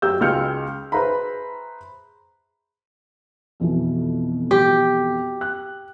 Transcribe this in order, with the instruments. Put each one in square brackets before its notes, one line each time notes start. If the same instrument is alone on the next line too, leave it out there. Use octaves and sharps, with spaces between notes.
[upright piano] F#2 F#3 G4 E6 G6
C#2 G#3 G5 F6 G6 C#7
G#4 B4 C5 E5 A#5 B5
[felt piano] F2 B2 E3
[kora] G4
[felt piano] F#6